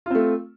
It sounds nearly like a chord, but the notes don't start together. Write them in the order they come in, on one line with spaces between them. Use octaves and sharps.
F4 C4 A3